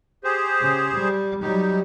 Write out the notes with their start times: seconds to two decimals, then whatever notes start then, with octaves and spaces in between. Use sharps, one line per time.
0.24 G4 G#4 C5
0.60 C#3
0.94 G3
1.41 F#3 G3 D#4 G4